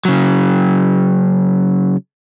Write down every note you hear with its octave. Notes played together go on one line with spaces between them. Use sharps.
C#3 F#3